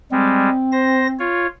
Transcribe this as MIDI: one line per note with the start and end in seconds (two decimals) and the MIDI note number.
0.12 0.49 55
0.12 0.49 56
0.12 1.27 60
0.72 1.07 72
0.72 1.07 94
1.19 1.47 65
1.19 1.47 73